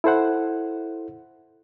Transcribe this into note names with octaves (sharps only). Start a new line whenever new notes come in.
E4 A4 C5 F#5